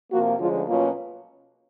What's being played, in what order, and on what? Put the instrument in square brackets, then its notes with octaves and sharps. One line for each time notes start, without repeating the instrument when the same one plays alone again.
[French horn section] C3 F3 A#3 [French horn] F#4
[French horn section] D2 D3 F3 G#3 C#4 [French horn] F4
[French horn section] B2 F#3 A#3 C#4 [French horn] F4